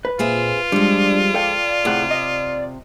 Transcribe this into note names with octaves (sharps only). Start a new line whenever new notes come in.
B4
A#2 C4 F4 G#4 E5
F3 G3 G#3 D4
A4 D5 F5 G5
A2 C3 G#4 F#5
D#5